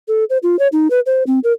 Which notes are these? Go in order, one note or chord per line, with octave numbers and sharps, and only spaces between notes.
A4
C5
F4
C#5
D#4
B4
C5
C4
A#4